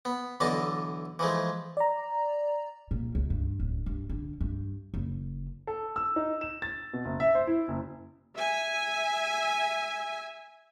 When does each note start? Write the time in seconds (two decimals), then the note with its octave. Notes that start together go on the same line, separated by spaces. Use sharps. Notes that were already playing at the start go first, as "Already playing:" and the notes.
0.05 B3
0.40 B1 D3 E3 D4 D#5 A5
1.19 E3 F3 G#3 A3
1.77 D5 A#5
2.91 A#2
3.15 C#2
3.30 G2
3.60 D1
3.86 G2
4.09 D3
4.41 G2
4.94 F#1
5.67 A4
5.96 E6
6.16 D#4
6.41 E7
6.62 A6
6.93 B2
7.05 F#1
7.20 E5
7.35 C5
7.47 E4
7.68 F#1
8.36 E5 G#5